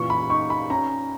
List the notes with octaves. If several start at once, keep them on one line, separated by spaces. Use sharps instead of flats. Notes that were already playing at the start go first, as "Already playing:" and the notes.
Already playing: A#2 C#3 E3 C#6
B5
D#4 C#6
B5
C#4 A#5